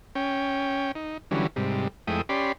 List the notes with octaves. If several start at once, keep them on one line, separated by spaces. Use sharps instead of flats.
C#4 G5
D#4
D3 E3 F#3 G3 C#4
G#2 C3 G3
F2 G#3 A3 E4 G5 D#6
C#4 G4 D5 B5 C6